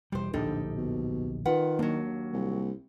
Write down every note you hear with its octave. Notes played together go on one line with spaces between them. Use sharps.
E1 G3 G4 C5
D1 A#1 D3 D#4 G4 A4
B2
D#3 F4 B4 F#5
D#2 F#3 A#3 D4
C2